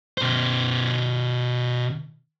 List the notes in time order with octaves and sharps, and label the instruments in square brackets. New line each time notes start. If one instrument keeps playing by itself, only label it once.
[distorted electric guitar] B2 C5